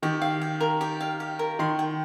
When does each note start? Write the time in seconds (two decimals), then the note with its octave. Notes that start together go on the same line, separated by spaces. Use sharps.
0.03 D#3 G4
0.22 F5
0.41 G4
0.60 A#4
0.81 G4
1.00 F5
1.20 G4
1.39 A#4
1.59 D#3 C6
1.79 G5